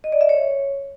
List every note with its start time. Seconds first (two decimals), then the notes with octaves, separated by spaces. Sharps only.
0.04 D#5
0.12 D5
0.21 E5
0.29 C#5